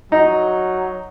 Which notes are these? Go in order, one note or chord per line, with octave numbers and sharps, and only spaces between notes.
F#3 D#4